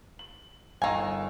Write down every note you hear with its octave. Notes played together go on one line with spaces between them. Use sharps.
F#7
G1 D#3 F5 G#5 E6